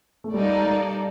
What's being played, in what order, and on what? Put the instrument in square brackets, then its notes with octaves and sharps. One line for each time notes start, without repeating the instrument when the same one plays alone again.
[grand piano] A3
[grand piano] G3 [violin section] A#3 D#4 A4 D5
[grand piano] G3